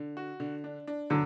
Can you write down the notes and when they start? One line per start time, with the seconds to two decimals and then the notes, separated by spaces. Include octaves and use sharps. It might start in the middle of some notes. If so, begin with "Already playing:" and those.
Already playing: D3
0.17 F#4
0.40 D3
0.64 D4
0.87 D4
1.10 D3 F#3